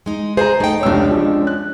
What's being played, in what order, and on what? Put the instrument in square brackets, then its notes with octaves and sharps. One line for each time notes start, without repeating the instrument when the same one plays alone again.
[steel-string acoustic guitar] G#3 D#4
[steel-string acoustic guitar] C3 G#4 [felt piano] C5 A#5
[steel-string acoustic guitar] A3 G5 [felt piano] D#4
[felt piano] F1 C#2 E6 [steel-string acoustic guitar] C#4 D4
[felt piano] F3 G#3
F#6